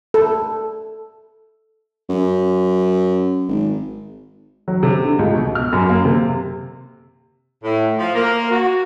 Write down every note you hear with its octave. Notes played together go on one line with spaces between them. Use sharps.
A4
F#2
G#1
F#3
C3
D3
C#2
B2
F6
F#2
A#3
C3
A2
F3
A#3
F#4